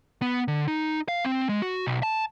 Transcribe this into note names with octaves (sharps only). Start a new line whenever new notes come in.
B3
D3
D#4
F5
C4
G#3
F#4
B1
A5